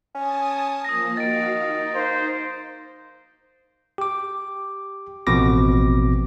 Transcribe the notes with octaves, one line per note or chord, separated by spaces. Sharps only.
C#4 G#5 A5 D#6
F3 A#3 D#6 A#6
D#3 F#4 F5 A6 D7
D#4
A#3 C5
G4 D6
A1 B2 F3 C4 D6 A#6